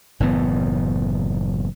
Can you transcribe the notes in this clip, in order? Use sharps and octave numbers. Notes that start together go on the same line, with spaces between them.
F#1 A2 E3 B3